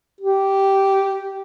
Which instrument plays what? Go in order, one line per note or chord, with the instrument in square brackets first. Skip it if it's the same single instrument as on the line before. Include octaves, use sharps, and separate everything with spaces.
[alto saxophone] G4